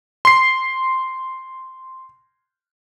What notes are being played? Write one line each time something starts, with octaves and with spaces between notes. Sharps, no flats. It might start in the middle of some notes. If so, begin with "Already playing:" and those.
C6 C7